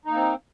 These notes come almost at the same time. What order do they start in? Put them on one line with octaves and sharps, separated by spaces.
D#4 A#3 C4